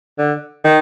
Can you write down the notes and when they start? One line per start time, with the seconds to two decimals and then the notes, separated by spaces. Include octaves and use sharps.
0.18 D3
0.64 D#3